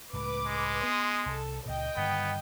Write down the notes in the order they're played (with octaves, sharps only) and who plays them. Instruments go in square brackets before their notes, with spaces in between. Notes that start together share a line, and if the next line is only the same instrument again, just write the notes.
[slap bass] C#2 A2 [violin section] B4 D6
[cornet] G#3
[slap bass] B3 [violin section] C6 D#6
[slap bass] C2 [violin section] A4
[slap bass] C#2 A#2 [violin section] D#5 G5
[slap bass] G2 D3 D#3 [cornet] B3